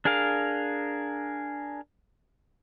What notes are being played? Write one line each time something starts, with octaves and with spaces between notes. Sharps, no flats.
D4 G#4 A#4 F5